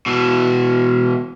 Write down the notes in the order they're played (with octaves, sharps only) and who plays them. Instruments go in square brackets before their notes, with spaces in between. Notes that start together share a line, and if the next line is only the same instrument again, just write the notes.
[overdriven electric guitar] B2 E3